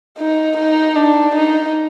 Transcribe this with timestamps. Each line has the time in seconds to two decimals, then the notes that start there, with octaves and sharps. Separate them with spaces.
0.18 D#4
0.57 D#4
0.95 D4
1.35 D#4